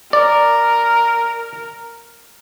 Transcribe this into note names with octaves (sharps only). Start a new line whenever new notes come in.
A#4 D5